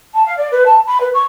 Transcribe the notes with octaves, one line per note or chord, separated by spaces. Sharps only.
A5
F5
D5
B4
A5
B5
B4
C#6